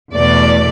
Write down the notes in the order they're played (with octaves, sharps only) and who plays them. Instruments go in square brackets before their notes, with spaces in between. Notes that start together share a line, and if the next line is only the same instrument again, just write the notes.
[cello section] E2 B2 A3 D5